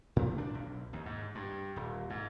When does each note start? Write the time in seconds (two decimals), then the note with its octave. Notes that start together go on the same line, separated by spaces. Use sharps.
0.16 A2
0.38 D4
0.55 B1
0.93 D#2
1.06 G#2
1.35 G2
1.76 D#1
2.10 G#2